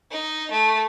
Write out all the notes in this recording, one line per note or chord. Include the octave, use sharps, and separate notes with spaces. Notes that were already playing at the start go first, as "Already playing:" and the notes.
D#4
A3